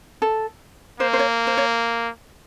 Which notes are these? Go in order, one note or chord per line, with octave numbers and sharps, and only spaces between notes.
A4
A#3 C5
C5
C#5
C5
C#5